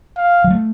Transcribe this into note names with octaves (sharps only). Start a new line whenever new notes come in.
F5
F#3
A3